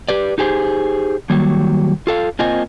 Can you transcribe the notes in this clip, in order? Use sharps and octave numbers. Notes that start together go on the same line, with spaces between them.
G4 B4 D5
D#4 G4 G#4 C5
D#3 F#3 G3 A#3
F4 A4 F5
A#3 C4 F4 D#5 G#5